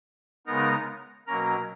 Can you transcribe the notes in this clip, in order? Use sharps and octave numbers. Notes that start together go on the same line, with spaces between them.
C#3 G#3 B3 D#4 A#4 A#5
B2 F#3 A#3 C#4 A#4 A#5